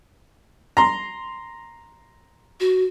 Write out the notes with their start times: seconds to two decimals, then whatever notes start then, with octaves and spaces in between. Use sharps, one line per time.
0.77 A#5 C6
2.60 F#4